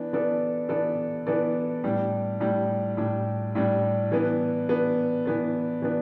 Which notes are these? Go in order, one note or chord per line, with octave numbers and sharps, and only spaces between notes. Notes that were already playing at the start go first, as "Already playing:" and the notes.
Already playing: E3 B3 D4
E3 B3 D4 A4 D5
E3 B3 D4 A4 D5
E3 B3 D4 A4 D5
A2 G3 D4
A2 G3 D4
A2 G3 D4
A2 G3 D4
E3 B3 D4
E3 B3 D4
E3 B3 D4
E3 B3 D4